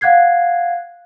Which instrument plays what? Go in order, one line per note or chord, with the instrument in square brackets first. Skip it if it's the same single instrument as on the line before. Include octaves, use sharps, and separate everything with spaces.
[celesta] F5 F#5 F#6 G#6 C7